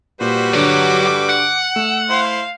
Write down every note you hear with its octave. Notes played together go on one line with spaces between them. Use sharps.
A#2 G3 F#4 B4 C5
G2 D3 F#3 D5 D6
F#5
A3 E6
E4 C5 F5